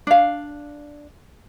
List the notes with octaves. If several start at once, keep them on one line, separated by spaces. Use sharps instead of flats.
D4 F5